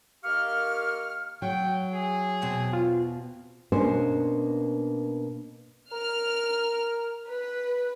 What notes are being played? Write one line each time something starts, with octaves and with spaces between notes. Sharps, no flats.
D#3 A#3 G4 F5 C#6 F6
F#3 G5
G#4
E2 B2 C4
F4
B2 A#3 C#4 D4 C5
A#4 F6
B4